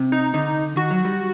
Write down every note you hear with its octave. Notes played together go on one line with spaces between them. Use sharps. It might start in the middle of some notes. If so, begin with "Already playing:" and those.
Already playing: C3
D#4
D3 D#4
D#3 F#4
F#3
G3